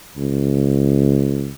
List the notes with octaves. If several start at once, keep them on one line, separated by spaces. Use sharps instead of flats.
C#2